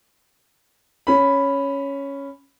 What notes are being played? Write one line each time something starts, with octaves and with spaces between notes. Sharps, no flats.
C#4 B5